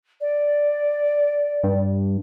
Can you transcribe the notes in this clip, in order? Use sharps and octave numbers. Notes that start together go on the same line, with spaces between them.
D5
G2